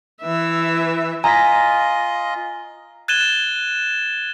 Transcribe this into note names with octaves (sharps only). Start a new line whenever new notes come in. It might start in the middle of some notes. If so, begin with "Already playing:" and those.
E3 E5
F4 D#5 G#5 A#5 A#6 B6
F#6 G#6 A6 D#7 E7 G7